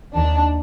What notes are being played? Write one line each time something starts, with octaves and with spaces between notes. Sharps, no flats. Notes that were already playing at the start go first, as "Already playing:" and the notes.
D#2 D#3 D4